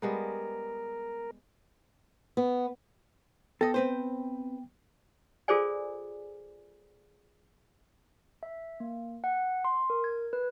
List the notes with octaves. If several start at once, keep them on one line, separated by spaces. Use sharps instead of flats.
G3 G#3 B3 A#4
B3
B3 A4 D#5 G5
C4 B4 C5
F4 G#4 A4 C5 D5 G#5
E5
A#3
F#5
C6
A#4
G#6
B4